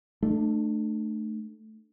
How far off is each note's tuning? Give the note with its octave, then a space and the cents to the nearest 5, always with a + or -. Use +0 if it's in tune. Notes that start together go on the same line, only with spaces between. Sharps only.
A3 +0 D4 +35